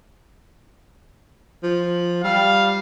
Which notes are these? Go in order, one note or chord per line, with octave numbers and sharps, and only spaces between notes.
F3
G3 F5